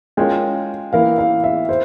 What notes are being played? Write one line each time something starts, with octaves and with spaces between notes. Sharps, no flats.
G#3 C#4 F4 A#4 G5
E3 A#3 E4 A#4 F5
F5
E5
E4 C5